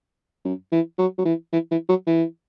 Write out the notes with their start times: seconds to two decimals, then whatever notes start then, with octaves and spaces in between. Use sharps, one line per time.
0.45 F#2
0.72 E3
0.98 F#3
1.18 F#3
1.25 E3
1.53 E3
1.71 E3
1.89 F#3
2.07 E3